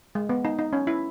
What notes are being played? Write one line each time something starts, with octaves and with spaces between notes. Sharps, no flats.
G#3
B3
D#4
D#4
C#4
E4